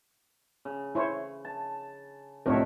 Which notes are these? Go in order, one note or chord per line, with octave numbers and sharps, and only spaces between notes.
C#3
E4 C5 C#5
A5
C2 A2 D#3 F3 D4 A#4 C#5 E5